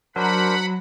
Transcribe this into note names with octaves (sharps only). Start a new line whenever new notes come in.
F#3 D4 A#4 C5 F#5 B5